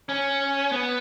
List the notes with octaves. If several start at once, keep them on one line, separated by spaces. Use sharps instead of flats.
C#4
B3